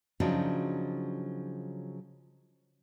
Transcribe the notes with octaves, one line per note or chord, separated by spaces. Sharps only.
C#3 F3 F#3 D4 D#4 F#4